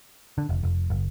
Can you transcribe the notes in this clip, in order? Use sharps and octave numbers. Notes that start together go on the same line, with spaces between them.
D3
F1
F1
F#1